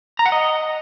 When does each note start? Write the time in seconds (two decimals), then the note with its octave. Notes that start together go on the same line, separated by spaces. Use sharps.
0.19 A#5
0.26 F#5
0.32 D#5